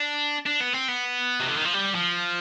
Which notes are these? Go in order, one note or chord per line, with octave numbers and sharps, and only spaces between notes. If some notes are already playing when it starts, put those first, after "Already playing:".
Already playing: D4
D4
B3
C4
B3
C3
D3
D#3
F3
G3
F3